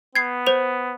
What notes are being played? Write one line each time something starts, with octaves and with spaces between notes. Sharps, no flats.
B3 G#6 C7
C5 F7